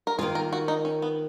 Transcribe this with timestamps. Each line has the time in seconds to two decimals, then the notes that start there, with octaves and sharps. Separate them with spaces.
0.07 A#4
0.19 D#3 A#3 F4 G#4
0.35 A#4
0.53 F#4
0.68 D#4
0.85 C#4
1.02 B3